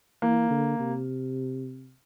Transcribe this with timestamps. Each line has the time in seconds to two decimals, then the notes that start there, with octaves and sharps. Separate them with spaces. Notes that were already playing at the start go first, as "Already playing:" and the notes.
0.22 E3 A#3
0.50 D3
0.80 C3